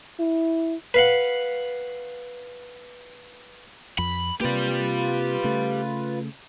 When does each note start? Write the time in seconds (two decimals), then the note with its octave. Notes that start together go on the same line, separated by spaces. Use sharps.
0.19 E4
0.94 B4 F5 F#5
3.98 F2 B5
4.41 C3 A#3 F4 G4 B4 D5
5.44 C#3 A3